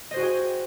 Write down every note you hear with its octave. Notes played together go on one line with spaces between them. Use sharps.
F#4 G#4 C5 D#5 G5